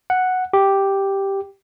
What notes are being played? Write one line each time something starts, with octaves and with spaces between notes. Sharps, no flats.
F#5
G4